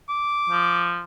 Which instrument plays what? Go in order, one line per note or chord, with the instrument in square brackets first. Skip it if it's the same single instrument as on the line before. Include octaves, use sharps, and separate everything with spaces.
[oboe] D6
[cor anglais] F3